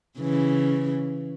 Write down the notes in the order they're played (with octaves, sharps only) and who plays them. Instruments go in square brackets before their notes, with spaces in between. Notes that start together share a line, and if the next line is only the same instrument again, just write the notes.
[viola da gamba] C#3 E3